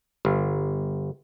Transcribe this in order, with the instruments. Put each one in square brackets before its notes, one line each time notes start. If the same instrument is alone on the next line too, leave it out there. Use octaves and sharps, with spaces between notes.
[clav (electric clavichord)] G1